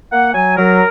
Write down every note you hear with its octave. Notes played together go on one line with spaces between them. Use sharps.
A#3 F#5
F#3 G#5
F#3 A#4